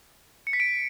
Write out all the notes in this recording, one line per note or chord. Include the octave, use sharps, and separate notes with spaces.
C#7
B6
D7